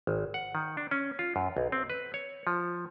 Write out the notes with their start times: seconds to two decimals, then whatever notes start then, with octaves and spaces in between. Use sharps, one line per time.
0.07 G#1
0.34 F#5
0.55 D#3
0.77 D4
0.91 C#4
1.19 F4
1.36 F#2
1.57 B1
1.72 C4
1.90 B4
2.14 C#5
2.47 F3